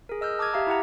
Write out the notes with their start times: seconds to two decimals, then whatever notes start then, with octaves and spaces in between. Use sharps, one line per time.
0.09 G#4 A#4
0.21 D#5 E6 F6 G6
0.39 A5 D6 D#6 F6 G#6
0.53 G4 E5 F5 A#5
0.67 E4 G4 F#5 A#5